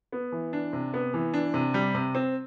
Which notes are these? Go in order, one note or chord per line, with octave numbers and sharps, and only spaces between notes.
B3
E3
D4
C3
B3
E3
D4
C3
G3
C3
C4